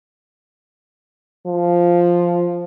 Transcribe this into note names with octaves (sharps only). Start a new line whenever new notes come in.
F3